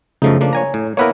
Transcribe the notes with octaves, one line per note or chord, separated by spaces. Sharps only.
F#2 C#3 F3 A3 D#4
F3 A#3 D4
C#5 G#5 A#5
A2
A#3 B3 E4 A#4 B4 C#5